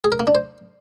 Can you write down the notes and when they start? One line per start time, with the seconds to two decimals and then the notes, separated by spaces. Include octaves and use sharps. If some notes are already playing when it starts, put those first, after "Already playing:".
0.04 G#4
0.12 A#4
0.20 A#3
0.27 D4
0.35 C5